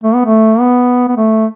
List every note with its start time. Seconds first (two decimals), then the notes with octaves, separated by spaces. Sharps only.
0.03 A3
0.14 B3
0.25 A3
0.60 B3
1.08 B3
1.16 A3